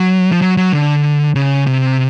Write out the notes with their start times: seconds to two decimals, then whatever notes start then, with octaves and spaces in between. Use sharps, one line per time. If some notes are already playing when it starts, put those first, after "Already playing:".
Already playing: F#3
0.32 F3
0.42 F#3
0.57 F#3
0.73 D3
1.35 C#3
1.67 C3